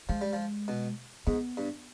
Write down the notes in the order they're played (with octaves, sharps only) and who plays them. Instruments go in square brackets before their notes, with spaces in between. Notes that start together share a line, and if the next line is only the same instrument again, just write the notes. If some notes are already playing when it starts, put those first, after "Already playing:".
[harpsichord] F3 [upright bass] G#3
[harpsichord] G3
F3
B2
[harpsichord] G#2 [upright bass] B3
[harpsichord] G2